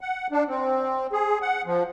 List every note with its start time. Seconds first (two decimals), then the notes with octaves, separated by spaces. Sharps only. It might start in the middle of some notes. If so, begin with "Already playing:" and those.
0.01 F#5
0.32 D4
0.48 C4
1.12 G#4
1.42 F#5
1.66 F3